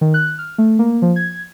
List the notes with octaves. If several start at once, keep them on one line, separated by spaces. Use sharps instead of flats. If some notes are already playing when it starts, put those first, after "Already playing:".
D#3
F#6
F6
A3
A#3
F3
G#6